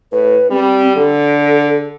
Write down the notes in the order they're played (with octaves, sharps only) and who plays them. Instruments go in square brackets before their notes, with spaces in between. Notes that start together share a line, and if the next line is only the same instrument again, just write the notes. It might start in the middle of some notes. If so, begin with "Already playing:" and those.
[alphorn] A2 [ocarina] B4
[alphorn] G3 [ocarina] C4
[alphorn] D3 [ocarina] A4